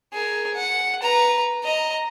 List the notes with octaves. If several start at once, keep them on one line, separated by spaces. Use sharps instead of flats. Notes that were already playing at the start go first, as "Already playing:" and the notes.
G#4 A#4
F#5
B4 A#5
D#5 A#5